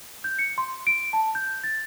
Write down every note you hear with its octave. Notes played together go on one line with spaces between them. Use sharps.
G6
C#7
C6
D7
A5
G6
A6